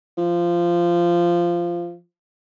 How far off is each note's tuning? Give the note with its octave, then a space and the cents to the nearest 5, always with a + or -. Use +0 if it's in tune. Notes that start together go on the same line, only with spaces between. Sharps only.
F3 -15